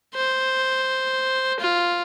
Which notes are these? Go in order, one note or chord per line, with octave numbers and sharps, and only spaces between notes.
C5
F4